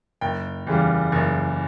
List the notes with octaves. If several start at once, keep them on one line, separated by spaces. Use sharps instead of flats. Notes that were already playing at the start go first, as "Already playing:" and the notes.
F#1 G5
E2 C#3 G3
F#1